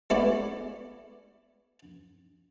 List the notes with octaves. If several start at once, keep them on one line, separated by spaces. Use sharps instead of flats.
G#3 A3 B3 E4 D5